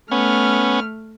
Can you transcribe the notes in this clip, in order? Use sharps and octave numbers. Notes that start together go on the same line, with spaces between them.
A3 B3 C#4 F6